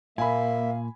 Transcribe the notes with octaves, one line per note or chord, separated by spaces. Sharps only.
A#2 A#3 E5 F5 G#5 B5